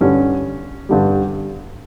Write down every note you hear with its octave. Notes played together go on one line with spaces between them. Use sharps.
G2 D3 G3 C#4
G2 D3 G3